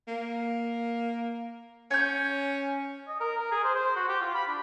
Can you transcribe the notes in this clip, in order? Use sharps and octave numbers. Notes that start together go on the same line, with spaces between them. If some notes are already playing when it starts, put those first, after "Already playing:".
A#3
C#4 C#5 G6
D#5
A#4
A#4
G#4
C5
C5
F#4
G4
F4
B5
D4